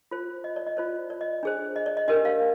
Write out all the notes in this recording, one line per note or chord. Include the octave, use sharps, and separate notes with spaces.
F4 C5
D#5
D5
D#5
F4 C5 D5
D5
D#5
D4 G#4 C5
D#5
D5
D#5
D4 G4 A#4 D#5
F5